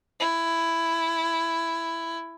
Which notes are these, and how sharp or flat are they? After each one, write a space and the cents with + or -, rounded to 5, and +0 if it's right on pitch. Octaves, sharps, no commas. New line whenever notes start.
E4 +10